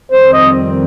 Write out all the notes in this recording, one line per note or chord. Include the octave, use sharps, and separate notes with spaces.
F2 D#3 G3 C4 C5
D#5